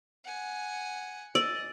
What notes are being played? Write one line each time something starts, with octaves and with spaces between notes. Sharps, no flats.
F#5 G#5
D5 D#5 E6